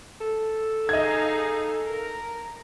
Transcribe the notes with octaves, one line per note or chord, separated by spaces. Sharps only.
A4
D#4 G#4 D#5 F5 G#6
A#4